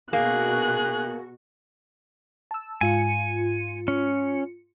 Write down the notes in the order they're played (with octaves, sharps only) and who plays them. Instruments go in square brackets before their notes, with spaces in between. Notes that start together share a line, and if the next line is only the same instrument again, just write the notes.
[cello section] B2 F#4 [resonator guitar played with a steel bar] A#3 [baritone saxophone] G#4 [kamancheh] F#6
[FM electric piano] A5 E6
[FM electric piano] G#2 F4 C#7 [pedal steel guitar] G#5
[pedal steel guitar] C#4